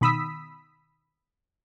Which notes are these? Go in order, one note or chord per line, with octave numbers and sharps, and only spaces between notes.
B2 D#3 B5 D#6 E6 B6